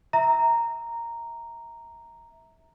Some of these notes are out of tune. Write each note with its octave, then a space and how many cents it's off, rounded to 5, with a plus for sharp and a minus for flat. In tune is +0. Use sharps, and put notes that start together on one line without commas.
E5 -20 A#5 -5